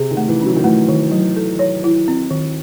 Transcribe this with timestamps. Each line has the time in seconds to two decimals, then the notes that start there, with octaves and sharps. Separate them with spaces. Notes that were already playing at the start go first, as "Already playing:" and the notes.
Already playing: C3 G#4
0.11 D#3
0.17 A3
0.28 E3
0.41 F#3 C#4
0.56 D#3
0.64 E3 A3
0.89 D#3
1.11 F#3
1.36 A4
1.59 C#5
1.84 E4
2.08 C4
2.31 D#3